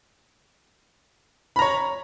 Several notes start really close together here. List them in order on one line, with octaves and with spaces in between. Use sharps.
B5 A#5 C#5